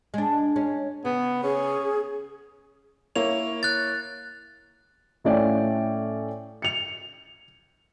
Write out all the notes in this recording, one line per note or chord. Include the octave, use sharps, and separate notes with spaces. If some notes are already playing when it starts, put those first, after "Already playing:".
G#3 D4
G#3 C#4
C#3 B3
C#4 G#4
A#3 E4 C#5 F7
F#6 A6
A2 A3 C#4 D5 F5 G5
C#7 F7